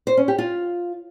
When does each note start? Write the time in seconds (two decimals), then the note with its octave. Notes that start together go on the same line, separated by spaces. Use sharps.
0.07 C5
0.17 C#4
0.28 G4
0.38 F4